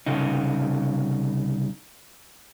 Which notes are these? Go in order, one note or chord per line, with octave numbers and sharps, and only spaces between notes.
C2 C#3 D#4